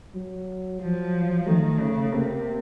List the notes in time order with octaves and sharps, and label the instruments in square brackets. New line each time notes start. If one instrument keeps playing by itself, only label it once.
[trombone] F#3
[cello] F3 [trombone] F#3
[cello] D#3 [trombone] A3
[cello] C#3
[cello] C3 [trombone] A#3